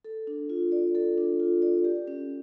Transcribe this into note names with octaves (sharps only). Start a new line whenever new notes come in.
A4
D4
F4
D5
A4
D4
F4
D5
G4
C#4